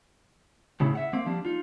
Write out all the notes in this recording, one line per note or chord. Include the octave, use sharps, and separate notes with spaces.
A2 C#3 E4
E5 F#5
A#3 C4 F5
F3 G3 A#3 D4
D#4 F4